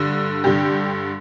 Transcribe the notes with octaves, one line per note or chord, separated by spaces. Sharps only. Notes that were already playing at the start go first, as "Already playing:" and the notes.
Already playing: G2 D3
G2 D3 G4